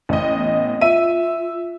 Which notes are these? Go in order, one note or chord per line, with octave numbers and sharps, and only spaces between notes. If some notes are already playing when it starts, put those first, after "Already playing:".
A1 D#5
B3
F4 E5 D#7